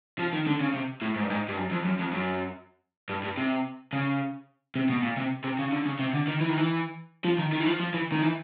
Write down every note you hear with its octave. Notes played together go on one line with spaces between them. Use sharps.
F3
D#3
D3
C#3
C3
A2
G#2
G2
G#2
G2
F#2
F2
F#2
F2
F#2
G2
G2
C3
C#3
C3
B2
A#2
C3
C3
C#3
D3
C#3
C3
D3
D#3
E3
D#3
E3
F3
D#3
D#3
E3
F3
F3
E3
D#3
E3